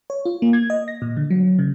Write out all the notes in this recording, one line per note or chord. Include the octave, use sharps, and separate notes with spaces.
C#5
F4
A#3
G#6
D#5
A#6
A#2
D3
F#3
C#3